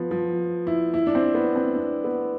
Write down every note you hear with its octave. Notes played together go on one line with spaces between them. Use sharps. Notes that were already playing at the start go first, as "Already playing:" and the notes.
Already playing: F3 B3
F3
E4
E4
D4
C4
B3
C4
D4
B3